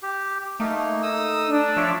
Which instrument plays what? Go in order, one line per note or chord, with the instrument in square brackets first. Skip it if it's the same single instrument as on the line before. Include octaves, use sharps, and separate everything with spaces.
[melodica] G4
[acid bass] A3 [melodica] A#3 D#4
[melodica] D#4 D#6 E6
[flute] D4
[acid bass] F3 [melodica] C#5 E5